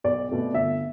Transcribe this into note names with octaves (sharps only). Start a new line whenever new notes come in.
B1 D5
B2 A3 C4
G1 E5